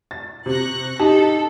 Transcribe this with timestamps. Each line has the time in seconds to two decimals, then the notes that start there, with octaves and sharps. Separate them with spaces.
0.11 A6
0.46 C3 C#6 F#6 A#6
0.99 D#4 G4 A4 A5